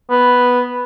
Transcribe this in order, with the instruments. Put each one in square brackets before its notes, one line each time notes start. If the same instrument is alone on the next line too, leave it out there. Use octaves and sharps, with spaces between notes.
[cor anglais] B3